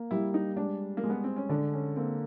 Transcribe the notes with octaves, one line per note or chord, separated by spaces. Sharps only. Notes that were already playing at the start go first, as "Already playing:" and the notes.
Already playing: A#3
G3 E4
D#4
G#3 D4
A#3
G#3
B3
C4
C#4
D3 D4
C#4
A#3 C4